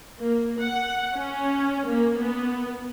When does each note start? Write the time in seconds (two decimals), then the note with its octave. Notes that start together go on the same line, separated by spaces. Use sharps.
0.21 A#3
0.61 F#5
1.15 C#4
1.88 A#3
2.20 B3